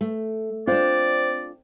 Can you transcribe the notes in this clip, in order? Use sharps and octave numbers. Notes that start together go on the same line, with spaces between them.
A3
C4 D4 F4 C5 D5